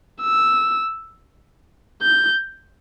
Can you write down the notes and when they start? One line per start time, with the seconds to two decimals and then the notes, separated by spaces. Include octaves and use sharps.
0.22 E6
2.02 G6